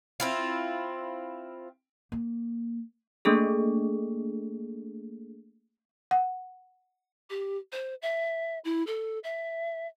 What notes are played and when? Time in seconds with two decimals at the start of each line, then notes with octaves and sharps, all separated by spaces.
0.20 C4 E4 F4
2.12 A#3
3.25 A3 A#3 D4 G#4 A4
6.11 F#5
7.30 G4
7.72 C5
8.02 E5
8.65 E4
8.87 A4
9.24 E5